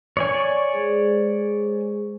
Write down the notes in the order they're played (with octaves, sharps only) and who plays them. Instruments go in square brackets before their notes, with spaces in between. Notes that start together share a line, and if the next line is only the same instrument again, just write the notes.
[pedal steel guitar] C#5 D5 G#5
[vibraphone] G#3 G#4 C5